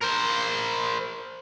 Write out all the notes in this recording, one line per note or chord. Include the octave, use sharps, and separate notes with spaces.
A#4 C5